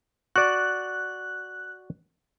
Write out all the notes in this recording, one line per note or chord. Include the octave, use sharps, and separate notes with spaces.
F#4 D5 F#6